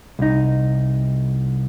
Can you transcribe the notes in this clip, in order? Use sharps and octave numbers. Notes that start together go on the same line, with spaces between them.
C2 D#4